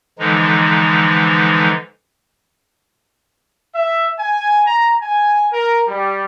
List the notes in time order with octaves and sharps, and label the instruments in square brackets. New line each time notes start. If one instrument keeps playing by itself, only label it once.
[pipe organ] D3 E3 F3 G#3 D#4
[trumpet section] E5
G#5
A#5
G#5
A#4
G3